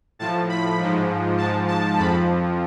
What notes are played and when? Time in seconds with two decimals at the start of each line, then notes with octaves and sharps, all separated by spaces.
0.19 A2 F3 A5
0.49 B5
0.79 G#2 F3
1.38 G#2 F3 A5
1.68 A5
1.97 F2 B5
2.02 F3